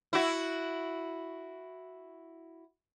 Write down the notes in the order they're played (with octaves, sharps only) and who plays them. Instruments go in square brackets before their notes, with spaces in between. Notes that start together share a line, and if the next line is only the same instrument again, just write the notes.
[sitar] E4 F#4